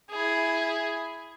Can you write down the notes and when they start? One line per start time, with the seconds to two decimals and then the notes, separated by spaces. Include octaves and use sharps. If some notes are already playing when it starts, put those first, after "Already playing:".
0.11 E4 G#4